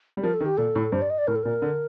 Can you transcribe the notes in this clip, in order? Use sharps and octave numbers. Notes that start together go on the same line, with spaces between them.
G3
F3 A#4
A4
D#3
G4
A#2 A4
A2
G2 C5
D5
D#5
D5
A2 A#4
A4
A#2 A#4
D3